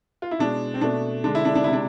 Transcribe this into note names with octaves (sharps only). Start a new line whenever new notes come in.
F4
E4
B2 G#3 D4
C4
B2 A3 D4
D3 G#3 D4
E4
D4
D4
C3 G#3 E4
D4